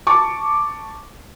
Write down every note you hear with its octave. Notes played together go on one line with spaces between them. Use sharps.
A5 C#6 D6